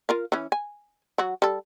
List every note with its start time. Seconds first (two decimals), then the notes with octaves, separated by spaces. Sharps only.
0.09 F4 A#4 F5
0.32 E3 C#4
0.52 G#5
1.18 F#3 F#4
1.42 G3 A4